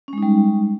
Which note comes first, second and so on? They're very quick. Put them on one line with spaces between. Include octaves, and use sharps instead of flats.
C#4 G#3 D#4 G3